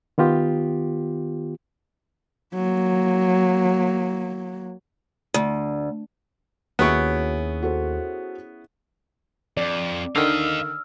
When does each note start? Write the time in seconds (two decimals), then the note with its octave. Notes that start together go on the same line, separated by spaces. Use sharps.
0.18 D#3 B3 F4 G4
2.54 F#3 A#3
5.34 D2
6.79 D#2 B3 C#4 E4 F#4 G#4 C#6 D7
7.62 F#4 A4 C5
9.57 F2 D5
10.16 D3 D#3 D#5 F5 E6 F6